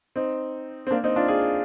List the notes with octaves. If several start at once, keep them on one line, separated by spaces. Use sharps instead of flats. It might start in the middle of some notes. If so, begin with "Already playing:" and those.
C4 D#4
C4
A#3 D4
C4 D#4
D4 F4
F4 G#4